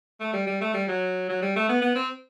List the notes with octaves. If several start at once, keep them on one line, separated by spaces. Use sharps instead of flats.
A3
G3
G3
A3
G3
F#3
F#3
G3
A3
B3
B3
C4